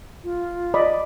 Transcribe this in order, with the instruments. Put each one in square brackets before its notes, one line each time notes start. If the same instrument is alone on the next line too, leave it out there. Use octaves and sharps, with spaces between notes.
[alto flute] F4
[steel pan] D5 D#5 B5